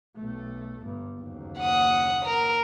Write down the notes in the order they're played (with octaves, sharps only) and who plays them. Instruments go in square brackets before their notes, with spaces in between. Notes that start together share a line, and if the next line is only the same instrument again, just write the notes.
[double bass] B1 A3
G1 G2
F#1 D#2
[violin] F#5 D#6
A#4